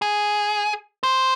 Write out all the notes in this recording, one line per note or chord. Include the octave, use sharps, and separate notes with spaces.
G#4
C5